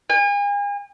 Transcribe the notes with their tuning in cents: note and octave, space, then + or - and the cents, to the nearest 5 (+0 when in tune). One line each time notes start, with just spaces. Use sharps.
G#5 -40